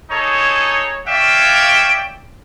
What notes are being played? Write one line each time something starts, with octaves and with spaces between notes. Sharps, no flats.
D#4 G#4 A4 C#5
C#5 D5 E5 F5 G5